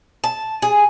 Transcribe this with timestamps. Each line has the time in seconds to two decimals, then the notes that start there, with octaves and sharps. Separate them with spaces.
0.24 A5
0.62 G#4